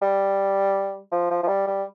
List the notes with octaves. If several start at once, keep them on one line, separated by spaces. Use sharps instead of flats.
G3
F3
F3
F3
G3
G3